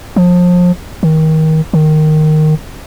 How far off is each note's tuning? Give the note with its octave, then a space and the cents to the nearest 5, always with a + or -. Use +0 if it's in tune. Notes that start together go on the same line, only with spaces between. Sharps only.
F3 +30
D#3 +25
D#3 -10